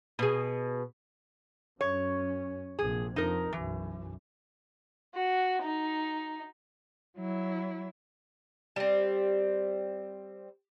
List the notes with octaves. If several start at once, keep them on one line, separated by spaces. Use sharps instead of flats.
B2 G#4
F#2 C#4 C#5
A#1 C3 G#4
F2 D#4 A#4
B1 F#2 E3
F#4
D#4
F#3 E4
G3 C4